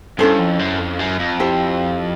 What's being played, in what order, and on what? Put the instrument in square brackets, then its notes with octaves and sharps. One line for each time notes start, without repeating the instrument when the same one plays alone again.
[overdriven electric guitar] G2 [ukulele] C#4 E4 A4 C5
[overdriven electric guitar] F2
F#2
F2
F#2
F2
[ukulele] E4 G4 C5